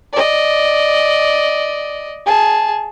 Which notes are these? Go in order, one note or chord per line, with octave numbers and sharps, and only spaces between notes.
D5 D#5
G#4 A5